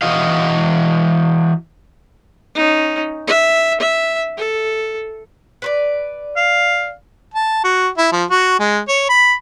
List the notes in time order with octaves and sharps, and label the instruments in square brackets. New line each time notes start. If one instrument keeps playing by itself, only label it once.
[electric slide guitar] E3 F#4 D#5 F5
[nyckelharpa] C#4 D#4
E5
E5
A4
[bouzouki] B4 C5 D5
[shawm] F5
[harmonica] A5
F#4
E4
F3
F#4
G#3
C#5
B5